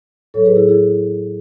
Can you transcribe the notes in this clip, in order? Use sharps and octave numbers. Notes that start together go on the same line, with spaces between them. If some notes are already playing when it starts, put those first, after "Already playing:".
A2 F#3 A4 C#5
G#4 B4
E4 G#4
E4 G#4